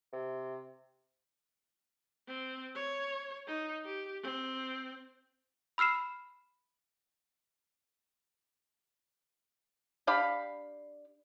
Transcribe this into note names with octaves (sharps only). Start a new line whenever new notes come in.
C3
C4
C#5
D#4
G4
C4
B5 E6 F6 C7 E7
D4 G4 F5 B5